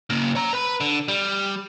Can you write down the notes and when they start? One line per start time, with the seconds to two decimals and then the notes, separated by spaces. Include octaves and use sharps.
0.10 C#3 A#3
0.35 C#5 A#5
0.53 B4 B5
0.80 D3
1.08 G3